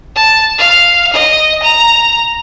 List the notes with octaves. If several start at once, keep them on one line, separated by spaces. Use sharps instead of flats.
A5
F5
D#5
A#5